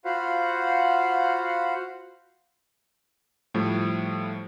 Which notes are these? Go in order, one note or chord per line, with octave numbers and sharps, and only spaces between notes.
F4 F#4 C5 F5 F#5 B5
A2 F3 G3